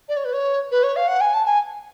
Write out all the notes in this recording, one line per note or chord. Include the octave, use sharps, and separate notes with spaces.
D5
C#5
B4
C#5
B4
C#5
F5
F#5
G#5
A5
G#5